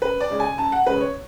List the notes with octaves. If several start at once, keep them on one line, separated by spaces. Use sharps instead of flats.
F#2 B4
D5
C#3 G#3 C#4
G#5
F#2 A5
F#5
C#3 G#3 C#4 B4
C#5